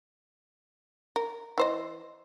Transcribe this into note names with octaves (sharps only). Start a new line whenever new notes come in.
A#4
E3 C5 D#5